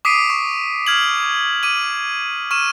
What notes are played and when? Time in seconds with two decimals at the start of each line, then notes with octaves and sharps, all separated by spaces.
0.05 D6 D#6 B6 C7 D7 D#7
0.30 C#6
0.87 F6 G#6 F#7
1.63 D6 D#7 F#7
2.51 C#6 F6 D#7 E7